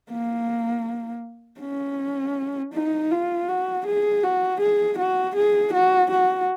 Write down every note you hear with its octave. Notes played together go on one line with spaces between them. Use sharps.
A#3
C#4
D#4
F4
F#4
G#4
F#4
G#4
F#4
G#4
F#4
F#4